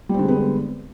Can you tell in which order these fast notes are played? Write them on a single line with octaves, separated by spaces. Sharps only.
G3 C4 D3 G#3 B3